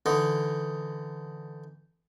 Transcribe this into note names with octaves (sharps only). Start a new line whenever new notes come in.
D3 E3 D#4